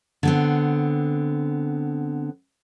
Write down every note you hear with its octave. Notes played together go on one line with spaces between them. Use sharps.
D3 B3 C4